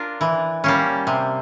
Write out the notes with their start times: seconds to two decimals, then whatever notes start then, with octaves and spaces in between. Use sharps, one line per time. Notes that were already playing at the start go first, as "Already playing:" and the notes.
Already playing: D4 F4 A#4
0.21 E3
0.64 G3 A#3 C#4
1.07 C3